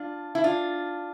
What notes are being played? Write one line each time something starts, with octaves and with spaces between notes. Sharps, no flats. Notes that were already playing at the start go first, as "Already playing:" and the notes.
Already playing: D4 F4
E4
D4 F4